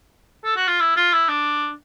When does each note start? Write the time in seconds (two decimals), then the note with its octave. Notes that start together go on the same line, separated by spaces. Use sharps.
0.44 A4
0.56 F#4
0.68 F4
0.80 E4
0.96 F4
1.13 E4
1.28 D4